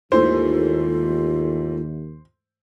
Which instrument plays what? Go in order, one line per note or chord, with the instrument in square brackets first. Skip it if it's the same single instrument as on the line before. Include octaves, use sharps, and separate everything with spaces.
[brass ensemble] D#2 [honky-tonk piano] G#2 E3 A3 [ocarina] F4 [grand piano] C5